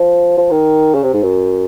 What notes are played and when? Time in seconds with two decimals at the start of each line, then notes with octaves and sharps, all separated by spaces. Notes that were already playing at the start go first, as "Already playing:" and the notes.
Already playing: F3
0.38 F3
0.51 D#3
0.94 C#3
1.03 C3
1.14 G#2
1.23 F#2